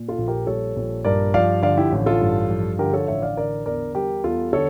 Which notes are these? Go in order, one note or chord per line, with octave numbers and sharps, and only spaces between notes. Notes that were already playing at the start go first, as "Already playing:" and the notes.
Already playing: A#2
F4 A4
A#1
G4 A#4
G3 A4 C#5
A#1
G2 A#4 D5
F3 D5 F5
D3 D5 F5
E4 G4
A1
F4 A4
G2
F3
D3 G4 A#4
A4 C#5
A1 C#5 E5
D5 F5
D3 A#4 D5
E2 A#4 D5
G3 G4 A#4
E2 F4 A4
D3 A4 C#5